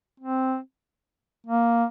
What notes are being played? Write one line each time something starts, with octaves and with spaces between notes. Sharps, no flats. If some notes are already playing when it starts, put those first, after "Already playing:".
C4
A#3